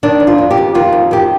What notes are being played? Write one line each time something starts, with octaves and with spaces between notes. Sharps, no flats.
D#3 D4
F2
F4
D#3
G4
F2
D#3 F4
F2
D#3 G4